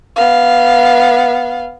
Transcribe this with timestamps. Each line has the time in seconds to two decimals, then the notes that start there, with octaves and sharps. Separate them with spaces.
0.16 B3 F5